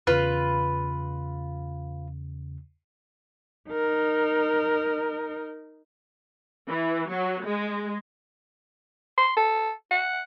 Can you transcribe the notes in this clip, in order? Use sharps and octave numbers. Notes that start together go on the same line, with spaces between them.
E2 C#3 F4 B4
D#4 A#4
E3
F#3
G#3
C6
A4
F#5